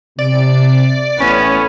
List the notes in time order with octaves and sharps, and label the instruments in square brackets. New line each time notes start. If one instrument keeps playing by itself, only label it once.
[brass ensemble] C3 [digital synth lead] D5
[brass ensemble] A1 A2 [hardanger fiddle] B3 [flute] C#4